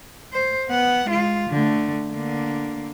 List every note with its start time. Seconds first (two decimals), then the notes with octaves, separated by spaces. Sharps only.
0.33 C5
0.70 B3 F#5
1.08 G#3 F4
1.50 D3 A3
2.12 D3 A#3